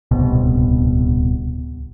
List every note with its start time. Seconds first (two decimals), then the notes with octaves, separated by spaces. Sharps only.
0.11 D1 C2 B2